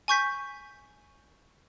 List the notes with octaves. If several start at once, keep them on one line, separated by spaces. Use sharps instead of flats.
G#5 C#6 G6 B6